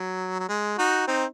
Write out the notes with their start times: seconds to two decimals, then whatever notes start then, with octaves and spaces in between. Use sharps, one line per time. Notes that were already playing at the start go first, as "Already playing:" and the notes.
Already playing: F#3
0.39 F#3
0.49 G#3
0.78 D#4 F#4
1.07 C4 D#4